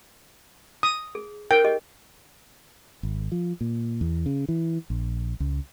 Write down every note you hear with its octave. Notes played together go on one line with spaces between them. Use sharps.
D#6
G#4
D#4 A#4 G5
G4 G#4 D#5
G#1
F3
A#2
E2
C#3
E3
A#1
C#2